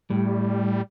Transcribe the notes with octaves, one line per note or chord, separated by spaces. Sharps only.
A2 G3